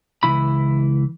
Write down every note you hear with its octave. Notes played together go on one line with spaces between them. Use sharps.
C#2 E3 E4 B5